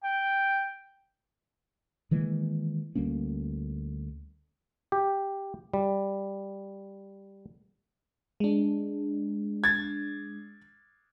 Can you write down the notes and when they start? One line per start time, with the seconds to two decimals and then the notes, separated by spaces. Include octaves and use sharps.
0.03 G5
2.11 D#3 E3 G#3 A#3
2.95 D2 G3 A#3 C#4
4.92 G4
5.74 G3
8.40 G#3 D4
9.64 G#6 A6